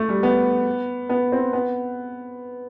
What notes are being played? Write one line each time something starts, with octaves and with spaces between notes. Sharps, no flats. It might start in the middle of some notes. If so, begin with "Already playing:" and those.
Already playing: A3
G3
B3
B3
C4
B3